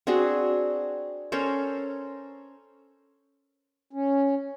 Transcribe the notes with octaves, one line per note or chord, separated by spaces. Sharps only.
C4 D4 F#4 G#4
C#4 A4 A#4 C5
C#4